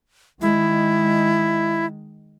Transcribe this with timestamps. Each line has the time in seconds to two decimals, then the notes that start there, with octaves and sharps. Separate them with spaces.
0.41 D#3 G#3 E4